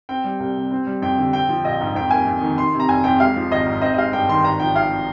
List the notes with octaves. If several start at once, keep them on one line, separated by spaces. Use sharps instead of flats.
C4 G5
G3
C2
C3
C4
G3
F2 G5
D3
C4 G5
F3
A#1 D#5
G#2
F2 G5
A#3 G#5
F2
D#3
D#3 C6
C3
A#5
F1 G#5
F2 G5
G#3 F5
F3
G#1 D#5
G#2
C4 D#5
D#5
G#3 F5
G2 G5
D#3 C6
G#1 A#5
F3 G5
G#1 F5